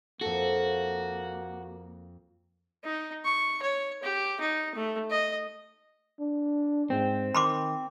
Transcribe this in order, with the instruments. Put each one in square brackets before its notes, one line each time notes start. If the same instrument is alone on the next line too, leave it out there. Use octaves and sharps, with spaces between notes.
[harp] F2 C#7 [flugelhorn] A#3 [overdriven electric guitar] F#4 [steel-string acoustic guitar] A4
[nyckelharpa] D#4
C#6
C#5
G4
D#4
A3
D#5
[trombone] D4
[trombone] G#2 [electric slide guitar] C4
[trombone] D#3 [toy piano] B5 C6 D6